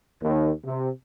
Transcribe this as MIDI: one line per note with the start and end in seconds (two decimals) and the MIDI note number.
0.22 0.51 39
0.64 0.89 48